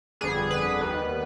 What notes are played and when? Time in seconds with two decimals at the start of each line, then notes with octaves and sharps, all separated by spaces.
0.21 G1 F2 D3 G3 B3 G#4
0.51 B4
0.81 D#2 D#3 G3 B3